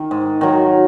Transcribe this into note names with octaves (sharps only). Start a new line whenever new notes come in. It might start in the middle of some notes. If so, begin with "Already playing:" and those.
Already playing: D#3
G#2
D#3 F#3